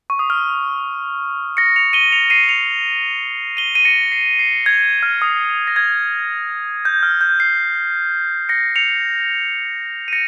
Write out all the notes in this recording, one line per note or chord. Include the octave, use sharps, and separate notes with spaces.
C#6
D#6
F6
A#6 C#7
C#7 F7
D#7 G7
C#7 F7
C7 D#7
D#7
C#7 F7
D#7 G7
D#7
A#6 C#7
C7
C7
G#6
F6
D#6
A#6
G#6
G6
F6
G6
C7
A#6 C#7
C#7 F7
D#7
A#6 C#7